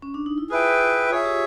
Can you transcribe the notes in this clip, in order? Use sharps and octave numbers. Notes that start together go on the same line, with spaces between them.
C#4
D4
D#4
E4
F4 G#4 B4 E5 G5
F4 G#4 C#5 E5
G4